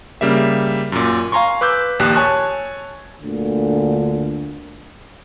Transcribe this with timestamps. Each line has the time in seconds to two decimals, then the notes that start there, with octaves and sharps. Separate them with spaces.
0.21 C#3 G3 A#3 E5
0.92 F#2 A#2
1.32 F5 G#5 A#5 C6 C#6
1.61 B4 D6 E6 G6
1.99 A#1 D#2 G4 D#6 F#6
2.15 C#5 G#5 A5 C#6 F#6
3.22 D2 A#2 D3